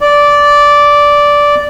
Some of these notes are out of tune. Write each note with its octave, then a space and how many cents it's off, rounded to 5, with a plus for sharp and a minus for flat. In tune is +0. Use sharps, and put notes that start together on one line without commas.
D5 -10